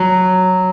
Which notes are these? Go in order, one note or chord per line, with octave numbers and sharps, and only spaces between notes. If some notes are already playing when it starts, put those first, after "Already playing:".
Already playing: F#3